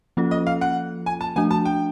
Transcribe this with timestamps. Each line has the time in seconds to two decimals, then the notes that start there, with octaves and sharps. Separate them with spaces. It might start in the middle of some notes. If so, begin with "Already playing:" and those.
0.17 F3 A#3 C#4 F4 A4
0.31 D#5
0.47 F5
0.61 F#5
1.06 G#5
1.21 A5
1.36 F3 A3 D4 F#4 G#5
1.51 A5
1.65 G5